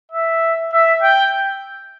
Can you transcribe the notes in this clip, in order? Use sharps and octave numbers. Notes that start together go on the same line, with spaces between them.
E5
E5
G5